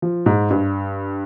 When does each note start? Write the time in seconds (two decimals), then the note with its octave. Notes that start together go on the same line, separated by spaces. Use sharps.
0.02 F3
0.26 G#2
0.50 G2